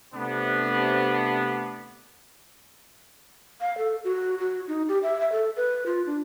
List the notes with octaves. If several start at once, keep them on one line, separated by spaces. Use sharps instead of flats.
C3 A3 B3 D4
F5
A4
F#4
F#4
D#4
G4
E5
E5
A4
B4
F4
D4